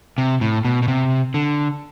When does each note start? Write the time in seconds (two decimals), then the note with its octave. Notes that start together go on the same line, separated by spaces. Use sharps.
0.18 C3
0.41 A2
0.65 B2
0.83 B2
0.88 C3
1.34 D3